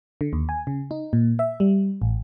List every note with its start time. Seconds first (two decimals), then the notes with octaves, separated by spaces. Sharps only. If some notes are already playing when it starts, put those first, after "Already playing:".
0.21 D3
0.33 D#2
0.49 G#5
0.67 C#3
0.91 D#4
1.13 A#2
1.39 E5
1.60 G3
2.02 A1